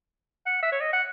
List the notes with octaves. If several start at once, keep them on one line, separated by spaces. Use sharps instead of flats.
F#5
E5
C#5
D#5
F#5